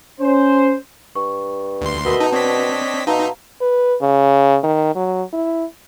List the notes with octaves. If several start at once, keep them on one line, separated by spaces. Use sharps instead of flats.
C#4 C5
G2 C#6
D2 C6
B2 F#4 A#4 D#5 E5 B5 G7
D#4 A5
C4 D4 C#5 D#5 B6
B2 D#4 E5 F5 A5 A#5 C6
B4
C#3
D#3
F#3
E4